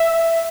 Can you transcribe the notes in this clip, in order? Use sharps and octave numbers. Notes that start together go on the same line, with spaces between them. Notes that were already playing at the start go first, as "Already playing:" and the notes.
Already playing: E5